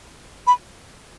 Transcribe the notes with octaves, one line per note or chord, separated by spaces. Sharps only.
B5